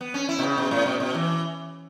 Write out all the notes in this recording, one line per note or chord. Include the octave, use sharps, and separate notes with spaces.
B3
C#4
E4
B2
C#3
B2
A2
B2
B2
E3